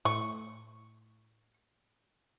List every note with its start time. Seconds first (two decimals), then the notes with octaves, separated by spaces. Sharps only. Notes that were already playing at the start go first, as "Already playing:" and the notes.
0.05 A2 C#6